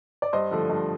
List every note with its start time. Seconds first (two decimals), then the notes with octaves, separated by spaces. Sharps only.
0.22 D5
0.33 G2 C5 D#5
0.51 D3 F3 A3
0.70 G2